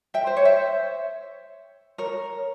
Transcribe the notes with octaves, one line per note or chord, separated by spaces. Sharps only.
E5 G5
C5
C#5
C5 E5
A#4 C#5